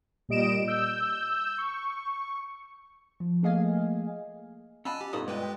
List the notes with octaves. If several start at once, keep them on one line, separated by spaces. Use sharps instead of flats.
A#2 G3 D#5 D7 E7
E6 G6
C#6
F3
A3 A#3 G#4 D#5 F5 G#5
C#4 F4 D#5 F#5 G#5 A5 B5 E6
G4
G2 B2 D#4 F4 F#4 A4 D5 D#5
G#3 A#3 B4 D5 D#5 G5
G4